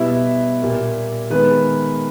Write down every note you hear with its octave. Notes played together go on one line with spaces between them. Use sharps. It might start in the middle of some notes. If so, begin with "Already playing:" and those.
Already playing: B2 G3 B3 E4 E5
A#2 G3 A#3
D#3 G#3 B3 B4